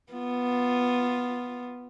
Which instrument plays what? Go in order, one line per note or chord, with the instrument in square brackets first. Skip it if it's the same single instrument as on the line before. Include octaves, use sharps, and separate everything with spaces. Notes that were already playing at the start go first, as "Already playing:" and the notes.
[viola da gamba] B3 F4